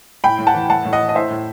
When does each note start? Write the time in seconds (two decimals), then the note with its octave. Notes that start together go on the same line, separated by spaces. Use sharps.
0.24 A2 G5 B5
0.39 A2
0.47 F#5 A5
0.54 E3
0.70 A2 F#5 A5
0.85 A2
0.93 D#5 F#5
1.00 E3
1.09 D#5
1.15 A2 C5 E5
1.30 A2